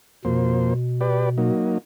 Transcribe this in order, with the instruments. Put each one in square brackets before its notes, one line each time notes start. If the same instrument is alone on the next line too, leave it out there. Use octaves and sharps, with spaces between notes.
[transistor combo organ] F2 A#3 C5 [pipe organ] B2
[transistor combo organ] G4 B4 D5
F#3 A#3 D#4